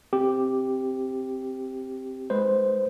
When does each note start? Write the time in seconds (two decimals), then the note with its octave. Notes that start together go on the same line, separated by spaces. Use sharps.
0.13 C4 G4
2.30 G#3 B4 C5